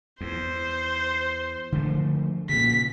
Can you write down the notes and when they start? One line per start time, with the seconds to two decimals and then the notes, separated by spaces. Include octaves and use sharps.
0.21 E2 C5
1.72 D3 F3 A3
2.49 A#2 C#3 B6